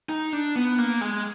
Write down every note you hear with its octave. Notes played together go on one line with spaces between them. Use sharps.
D#4
D4
B3
A#3
G#3